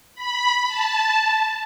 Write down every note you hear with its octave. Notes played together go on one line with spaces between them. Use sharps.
B5
A5